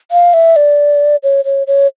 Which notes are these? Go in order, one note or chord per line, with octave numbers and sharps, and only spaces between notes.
F5
E5
D5
C#5
C#5
C#5